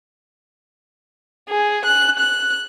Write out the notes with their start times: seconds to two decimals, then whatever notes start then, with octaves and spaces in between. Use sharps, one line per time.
1.49 G#4
1.85 F#6
2.19 F#6